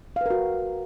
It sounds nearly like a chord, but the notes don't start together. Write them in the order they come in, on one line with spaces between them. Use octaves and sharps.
F5 B4 A#4 F#4